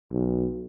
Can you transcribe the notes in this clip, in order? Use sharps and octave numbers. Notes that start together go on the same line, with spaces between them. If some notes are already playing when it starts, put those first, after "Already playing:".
B1